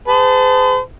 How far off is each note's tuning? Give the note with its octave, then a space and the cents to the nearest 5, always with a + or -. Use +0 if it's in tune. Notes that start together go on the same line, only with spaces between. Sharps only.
G#4 -15 C5 -45 A5 +0